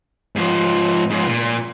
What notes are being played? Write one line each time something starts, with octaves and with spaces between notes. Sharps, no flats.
G#2 F3
G#2 F3
A#2